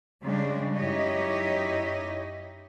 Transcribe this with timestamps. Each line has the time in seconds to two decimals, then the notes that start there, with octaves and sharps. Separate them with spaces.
0.22 C#3 G3 G#3 D4
0.74 F#2 D#4 E4 G4 C#5 D#5